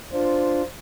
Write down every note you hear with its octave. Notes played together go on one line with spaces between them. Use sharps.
D4 F4 C5